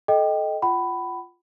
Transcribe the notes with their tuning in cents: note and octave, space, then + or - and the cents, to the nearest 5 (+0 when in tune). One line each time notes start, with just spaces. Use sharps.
A4 -20 D#5 +0 G5 +0
F4 +0 F#5 +40 B5 +10